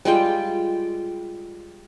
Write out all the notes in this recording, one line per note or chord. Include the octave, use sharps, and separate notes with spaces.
G3 G#3 F4 G5